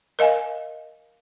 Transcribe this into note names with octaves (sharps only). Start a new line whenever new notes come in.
A#4 D#5 F5 G#5